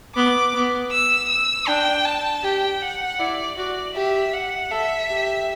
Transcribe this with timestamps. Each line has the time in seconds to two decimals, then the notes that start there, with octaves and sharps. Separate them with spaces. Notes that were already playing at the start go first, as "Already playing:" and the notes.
0.15 B3 D6
0.53 B3
0.92 E6
1.29 E6
1.67 D4 G5
2.05 A5
2.43 G4 G5
2.82 F#5
3.19 E4 D5
3.57 F#4 D5
3.95 G4 E5
4.34 F#5
4.71 A4 E5
5.09 G4